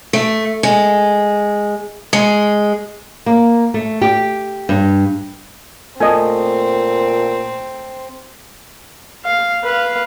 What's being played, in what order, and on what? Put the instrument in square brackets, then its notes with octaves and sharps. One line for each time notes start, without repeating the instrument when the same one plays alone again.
[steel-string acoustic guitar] A3
G#3
G#3
[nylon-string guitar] A#3
A3
G4
G2
[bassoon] A#2 [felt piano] A3 [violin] C4 [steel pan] D#5 G#5
[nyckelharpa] F5
B4 F5